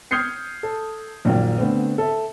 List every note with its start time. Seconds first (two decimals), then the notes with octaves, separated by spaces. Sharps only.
0.11 D#6 F6 G6 G#6 C7 C#7
0.63 A4
1.25 A#1 F#2 A#2 D#3 A#3
1.58 D3 A3 B3 C4
1.98 A4 E5